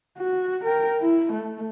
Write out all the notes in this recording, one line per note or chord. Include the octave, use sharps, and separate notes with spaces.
F#4
A#4 G5
E4
A3